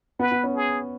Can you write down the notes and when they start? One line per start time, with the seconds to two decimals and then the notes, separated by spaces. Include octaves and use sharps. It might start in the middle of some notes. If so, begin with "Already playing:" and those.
0.19 B3 B4
0.32 B3
0.43 C#4
0.55 G#4